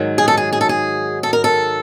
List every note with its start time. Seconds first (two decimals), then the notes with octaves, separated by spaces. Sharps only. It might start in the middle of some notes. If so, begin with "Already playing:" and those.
Already playing: G#2 D#3 F#3
0.18 G#4
0.28 A4
0.37 G#4
0.53 G#4
0.61 A4
0.69 G#4
1.23 A4
1.33 A#4
1.44 A4